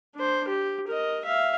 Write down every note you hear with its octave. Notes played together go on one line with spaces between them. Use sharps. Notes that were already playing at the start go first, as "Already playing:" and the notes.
D4 C5
G4
A#4 D#5
E5 F5